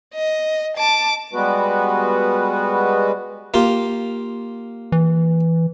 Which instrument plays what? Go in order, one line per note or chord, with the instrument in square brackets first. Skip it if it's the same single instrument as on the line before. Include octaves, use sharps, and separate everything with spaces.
[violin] D#5
A5 D6
[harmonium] G3 G#3 B3 F#4 B4
[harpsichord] A#3 F4 G4
[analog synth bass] E3